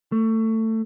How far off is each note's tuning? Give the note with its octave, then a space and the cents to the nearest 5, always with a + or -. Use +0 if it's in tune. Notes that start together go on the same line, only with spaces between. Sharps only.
A3 +20